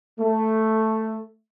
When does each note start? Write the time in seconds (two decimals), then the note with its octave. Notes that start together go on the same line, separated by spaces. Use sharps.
0.19 A3